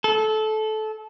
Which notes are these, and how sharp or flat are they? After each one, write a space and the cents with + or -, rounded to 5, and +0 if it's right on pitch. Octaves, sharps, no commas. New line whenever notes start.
A4 -20